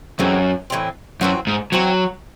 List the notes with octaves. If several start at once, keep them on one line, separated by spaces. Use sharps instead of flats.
F#2 A2 E3 G#3 C4
A2 E3 G#3 C4
F#2 E3 C4 F#4
G#2
E3 F#3 C4 F#4